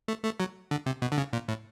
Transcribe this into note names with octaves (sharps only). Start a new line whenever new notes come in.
A3
A3
F#3
D3
C3
B2
D3
C#3
A#2
A2